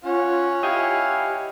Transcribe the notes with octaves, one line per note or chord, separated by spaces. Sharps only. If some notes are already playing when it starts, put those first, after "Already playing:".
C#4 F4 C#5 F#5
E4 G4 D#5 F5 G5 G#5